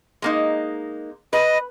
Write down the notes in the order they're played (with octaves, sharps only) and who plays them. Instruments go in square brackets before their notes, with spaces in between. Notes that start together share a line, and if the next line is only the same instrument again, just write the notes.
[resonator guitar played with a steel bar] G#3 A#3 D#4
[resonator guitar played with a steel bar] B4 [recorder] D#5